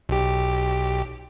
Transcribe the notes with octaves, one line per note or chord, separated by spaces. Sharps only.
B1 G4